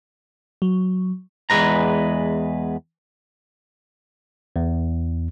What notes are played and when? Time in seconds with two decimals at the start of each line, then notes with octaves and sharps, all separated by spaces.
0.62 F#3
1.50 E2 C3 G#3 B4 A#5
4.56 E2